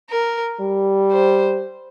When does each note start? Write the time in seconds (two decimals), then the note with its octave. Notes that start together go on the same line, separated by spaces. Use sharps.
0.10 A#4
0.61 G3
1.12 C5